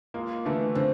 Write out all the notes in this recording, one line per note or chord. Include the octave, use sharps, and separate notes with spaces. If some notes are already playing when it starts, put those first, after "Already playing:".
G#3 A#3 F4
D3 E3 A3
D3 C4